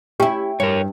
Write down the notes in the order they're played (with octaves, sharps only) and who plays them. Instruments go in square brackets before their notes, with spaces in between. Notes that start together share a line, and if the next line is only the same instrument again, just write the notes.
[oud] C#4 E4 [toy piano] G4 [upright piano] G5
[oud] G2 [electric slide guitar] A#4 C#5